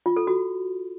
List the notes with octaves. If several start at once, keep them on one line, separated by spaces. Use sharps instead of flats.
F4
A4
F#4